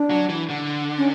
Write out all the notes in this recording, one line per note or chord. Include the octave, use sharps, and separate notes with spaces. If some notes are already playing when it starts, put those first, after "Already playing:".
Already playing: D4
F#3
E3
D3
C#4